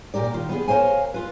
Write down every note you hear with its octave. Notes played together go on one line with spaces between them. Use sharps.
A#2 G4 A#4 D5
D#3 F4
B3 G4 G#4
A#4 C5 C#5 F5 G#5
F4 B4